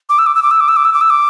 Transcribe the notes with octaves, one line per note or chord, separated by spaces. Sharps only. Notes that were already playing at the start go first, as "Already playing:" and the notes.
D6
E6
D6
E6
D6
E6
D6
E6
D6
E6
D6
E6
D6